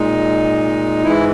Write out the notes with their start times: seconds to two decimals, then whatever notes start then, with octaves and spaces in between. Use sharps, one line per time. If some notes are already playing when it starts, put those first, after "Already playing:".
Already playing: A#2 G#3 D#4
1.04 G#2 E3 G#3 E4